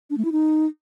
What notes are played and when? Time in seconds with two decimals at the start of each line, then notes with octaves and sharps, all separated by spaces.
0.10 D4
0.17 A3
0.25 E4
0.32 D#4